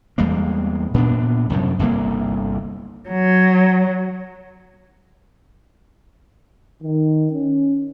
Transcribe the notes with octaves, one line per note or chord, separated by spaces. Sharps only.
E2 G3 G#3 A#3
A#2 B3 D4
C2 F#2 A2
G1 C2 D3 A#3
F#3
D#3
C#4